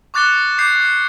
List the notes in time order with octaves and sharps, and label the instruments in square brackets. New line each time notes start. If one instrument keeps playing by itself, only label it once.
[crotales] C#6 D6 F#6 A6 C#7 G7
D6 G6 C7